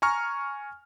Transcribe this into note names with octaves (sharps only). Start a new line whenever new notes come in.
G#5 A#5 C#6 F6